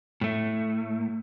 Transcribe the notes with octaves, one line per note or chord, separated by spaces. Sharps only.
A2 A3